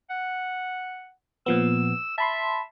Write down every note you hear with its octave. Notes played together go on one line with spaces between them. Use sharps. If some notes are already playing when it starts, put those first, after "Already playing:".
F#5
A#2 F3 B3 E6
E5 A5 B5 C6